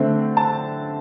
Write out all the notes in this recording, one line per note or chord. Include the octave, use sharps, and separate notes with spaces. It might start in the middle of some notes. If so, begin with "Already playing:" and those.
Already playing: D3 A3 C4
A5